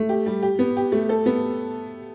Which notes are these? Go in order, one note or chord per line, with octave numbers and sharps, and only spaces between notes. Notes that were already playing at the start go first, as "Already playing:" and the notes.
Already playing: A3
G4
G3
G4
B3
G4
A3
A4
B3